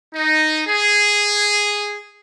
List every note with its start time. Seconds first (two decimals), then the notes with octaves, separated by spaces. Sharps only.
0.15 D#4
0.67 G#4